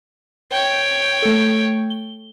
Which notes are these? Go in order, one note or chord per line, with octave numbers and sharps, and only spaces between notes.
C#5 G5 G6 G7
A3 A4
G7